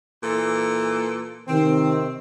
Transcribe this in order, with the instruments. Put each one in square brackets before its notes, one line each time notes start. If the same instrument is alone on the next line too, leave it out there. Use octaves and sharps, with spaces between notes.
[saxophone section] A#2 E3 A4
[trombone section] C3 D#3 [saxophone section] C4